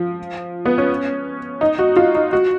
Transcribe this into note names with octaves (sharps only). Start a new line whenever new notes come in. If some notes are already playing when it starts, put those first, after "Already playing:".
Already playing: F3
B3
C#4
D#4
F#4
F4
D#4
F#4